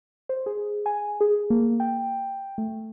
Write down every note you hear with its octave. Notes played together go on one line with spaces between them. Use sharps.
C5
G#4
G#5
G#4
A#3
G5
A3